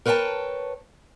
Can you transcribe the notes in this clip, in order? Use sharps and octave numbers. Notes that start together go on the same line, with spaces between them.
A#4 B4 C#5 D#5 G5 A5